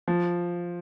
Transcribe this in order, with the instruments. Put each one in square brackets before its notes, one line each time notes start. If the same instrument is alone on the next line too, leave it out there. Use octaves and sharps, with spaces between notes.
[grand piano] F3